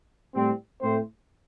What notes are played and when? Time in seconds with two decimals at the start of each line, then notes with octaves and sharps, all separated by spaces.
0.34 A2 G3 C4
0.82 A2 A3 C4 C5